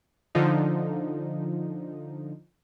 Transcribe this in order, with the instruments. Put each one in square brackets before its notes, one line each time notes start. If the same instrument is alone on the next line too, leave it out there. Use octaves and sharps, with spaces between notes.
[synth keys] D3 F3 D#4